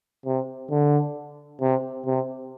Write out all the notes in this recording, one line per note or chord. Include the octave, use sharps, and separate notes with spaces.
C3
D3
C3
C3